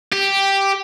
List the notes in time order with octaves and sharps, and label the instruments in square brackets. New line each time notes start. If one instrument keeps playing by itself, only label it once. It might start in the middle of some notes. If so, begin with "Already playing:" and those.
[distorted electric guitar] G4